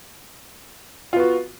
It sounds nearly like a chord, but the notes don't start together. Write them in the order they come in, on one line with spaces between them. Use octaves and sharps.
F4 B3 F#4